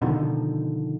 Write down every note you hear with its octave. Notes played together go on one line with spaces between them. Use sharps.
B2 D3 D#3 F3